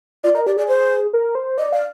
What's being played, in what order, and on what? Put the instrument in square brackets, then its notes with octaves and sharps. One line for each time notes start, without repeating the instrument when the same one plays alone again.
[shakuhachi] F4 [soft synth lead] D5
[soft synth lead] A#4 [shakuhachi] D#5
[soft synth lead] G4 [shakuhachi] D5
[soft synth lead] G#4 [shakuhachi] D5
[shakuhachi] C5
[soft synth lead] A#4
C5
[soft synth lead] D5 [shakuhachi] D#5
[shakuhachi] D5 [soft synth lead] F5